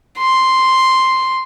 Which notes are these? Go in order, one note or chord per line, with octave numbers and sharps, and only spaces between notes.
C6